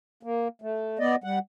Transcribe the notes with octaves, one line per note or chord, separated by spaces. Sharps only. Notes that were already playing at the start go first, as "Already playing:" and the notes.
A#3
A3
B3 D5 D#5
G3 F#5